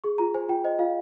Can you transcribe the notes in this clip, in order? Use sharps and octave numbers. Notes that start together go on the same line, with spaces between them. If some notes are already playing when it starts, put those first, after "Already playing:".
G#4 C#6
F4 A#5
C5 G#5
F4 G5
C5 D#5
F4 F5